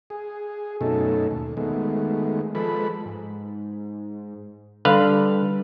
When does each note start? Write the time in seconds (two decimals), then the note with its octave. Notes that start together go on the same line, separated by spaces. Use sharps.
0.10 G#4
0.81 F#2 B2 A3 C#4 D#4 A4
1.31 D#2
1.57 D#3 G#3 A3 B3
2.55 F3 G#3 A4 B4 B5
3.06 G#2
4.85 D3 G3 B4 F5